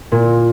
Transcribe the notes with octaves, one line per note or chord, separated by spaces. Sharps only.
A#2